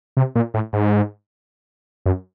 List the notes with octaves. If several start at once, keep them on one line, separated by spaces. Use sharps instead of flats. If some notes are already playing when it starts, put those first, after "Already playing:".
C3
A#2
A2
G#2
F#2